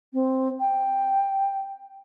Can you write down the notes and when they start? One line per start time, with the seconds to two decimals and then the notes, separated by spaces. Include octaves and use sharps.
0.13 C4
0.60 G5